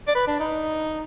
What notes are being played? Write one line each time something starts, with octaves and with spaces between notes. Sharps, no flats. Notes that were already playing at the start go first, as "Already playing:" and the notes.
D5
B4
D4
D#4